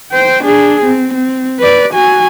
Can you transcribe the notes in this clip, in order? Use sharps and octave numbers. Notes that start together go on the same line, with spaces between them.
C5 G5
D4 G#4
C4
C4
B4 D5
F#4 G#5